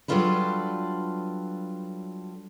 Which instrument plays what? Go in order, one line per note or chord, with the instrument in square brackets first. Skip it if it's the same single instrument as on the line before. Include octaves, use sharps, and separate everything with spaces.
[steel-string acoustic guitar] F#3 G3 D4 F4 A4 B4